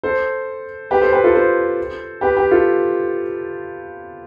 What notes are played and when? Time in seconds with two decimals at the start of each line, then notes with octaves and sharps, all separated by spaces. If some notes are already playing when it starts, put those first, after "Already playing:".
0.03 A4 C5
0.91 G4 B4
1.01 A4 C5
1.12 G4 B4
1.24 F4 A4
1.35 A4 C5
2.21 G4 B4
2.36 G4 B4
2.51 F4 A4